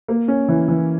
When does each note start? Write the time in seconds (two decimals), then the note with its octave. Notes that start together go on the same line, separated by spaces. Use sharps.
0.08 A#3
0.28 C#4
0.49 E3
0.68 E3